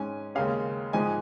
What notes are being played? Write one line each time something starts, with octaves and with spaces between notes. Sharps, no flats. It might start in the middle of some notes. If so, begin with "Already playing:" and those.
Already playing: G#2 G#3 C#4 G#5
D#2 C#3 G#3 C#4 F5
G#2 F3 G#3 D#4 G#5